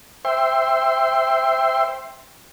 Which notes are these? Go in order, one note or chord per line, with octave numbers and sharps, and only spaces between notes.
C5 E5 G5 C6